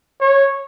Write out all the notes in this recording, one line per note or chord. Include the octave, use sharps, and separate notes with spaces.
C#5